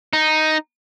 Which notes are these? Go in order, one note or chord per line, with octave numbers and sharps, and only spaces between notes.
D#4